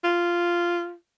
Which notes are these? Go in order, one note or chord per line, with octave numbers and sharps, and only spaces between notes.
F4